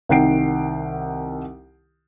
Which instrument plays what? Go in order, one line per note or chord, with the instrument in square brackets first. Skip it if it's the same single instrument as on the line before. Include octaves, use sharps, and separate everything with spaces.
[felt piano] C2 D#3 F#5 G5 C7 D7